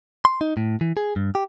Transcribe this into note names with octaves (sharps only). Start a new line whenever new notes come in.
C6
D#4
A2
E3
G#4
G2
G4